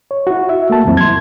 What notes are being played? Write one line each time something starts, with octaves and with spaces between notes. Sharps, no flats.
C#5
E4 F#4
E5
A3 A#3 A5
C2 F2 E3 F#3 C4 E4
C6 G#6